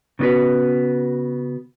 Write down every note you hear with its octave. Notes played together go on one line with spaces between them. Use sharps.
C#3 B3 C#4 F#4 B4